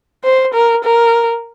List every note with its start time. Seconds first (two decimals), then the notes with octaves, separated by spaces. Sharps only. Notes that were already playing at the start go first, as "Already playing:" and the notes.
0.24 C5
0.54 A#4
0.84 A#4